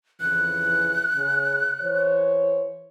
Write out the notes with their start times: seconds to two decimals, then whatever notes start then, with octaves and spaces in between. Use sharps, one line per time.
0.20 F2 C#3 E3 F#6
1.15 C#3
1.81 E3 C5 C#5